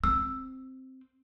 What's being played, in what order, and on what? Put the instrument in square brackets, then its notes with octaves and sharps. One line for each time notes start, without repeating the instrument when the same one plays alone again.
[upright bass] C4 [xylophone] E6